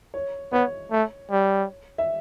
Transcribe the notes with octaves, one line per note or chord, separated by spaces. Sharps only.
C#5
B3 C#5
A3
G3
E5